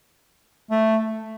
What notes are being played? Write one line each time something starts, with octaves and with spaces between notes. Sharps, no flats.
A3